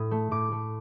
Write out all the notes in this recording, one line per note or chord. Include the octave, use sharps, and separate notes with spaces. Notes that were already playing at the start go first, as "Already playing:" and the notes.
Already playing: A2 D#6
A3
A2 D6
A3